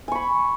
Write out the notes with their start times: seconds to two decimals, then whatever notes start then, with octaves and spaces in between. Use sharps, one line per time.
0.08 G#5
0.12 C#6
0.15 B5